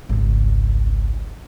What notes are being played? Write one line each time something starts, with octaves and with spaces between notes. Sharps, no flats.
G#1 C#2